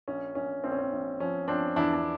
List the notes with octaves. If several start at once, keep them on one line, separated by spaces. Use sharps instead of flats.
A#1 C#4
A#1 C#4
A#1 C4
C#4
C4
A#1
F3 C#4
F3 C4 D4
E2 D4 E4
D4